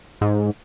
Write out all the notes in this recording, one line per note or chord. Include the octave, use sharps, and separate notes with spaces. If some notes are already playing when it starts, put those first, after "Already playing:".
G#2